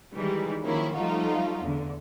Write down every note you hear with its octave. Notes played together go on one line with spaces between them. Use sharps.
D#3 E3 G3 G#3 D#4
D#3 F3 F#3 A#3 C#4 E4
F3 G3 A3 D#4 F4 F#4
E2 D3